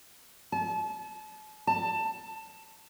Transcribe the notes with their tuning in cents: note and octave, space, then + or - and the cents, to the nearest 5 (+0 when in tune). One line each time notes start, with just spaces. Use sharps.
A5 -35
A5 +15